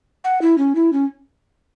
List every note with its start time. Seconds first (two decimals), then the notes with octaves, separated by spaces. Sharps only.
0.24 F#5
0.42 E4
0.58 C#4
0.75 E4
0.93 C#4